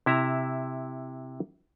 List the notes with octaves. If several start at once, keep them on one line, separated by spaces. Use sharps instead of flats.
C3 E4 E5 A#5